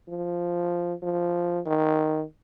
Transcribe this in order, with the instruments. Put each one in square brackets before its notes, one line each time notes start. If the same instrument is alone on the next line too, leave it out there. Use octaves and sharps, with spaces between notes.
[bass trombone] F3
F3
D#3